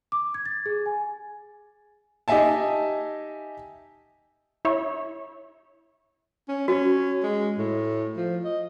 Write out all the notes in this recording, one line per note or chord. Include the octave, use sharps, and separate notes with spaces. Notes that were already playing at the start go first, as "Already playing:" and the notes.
D6
G#6
A6
G#4
G#5
D#4 G4 D#5 E5 G#5 A5
E4 C#5
C#4
C#4 F#4
G#3
A2
F3
D#5